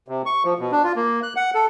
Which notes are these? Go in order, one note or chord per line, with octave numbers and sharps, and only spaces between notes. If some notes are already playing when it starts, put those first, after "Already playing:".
C3
C#6
F3
B2
D4
F4
A#3
F#6
F#5
A4